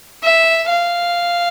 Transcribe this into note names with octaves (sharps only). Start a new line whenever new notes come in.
E5
F5